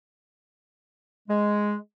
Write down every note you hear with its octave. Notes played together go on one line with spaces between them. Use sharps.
G#3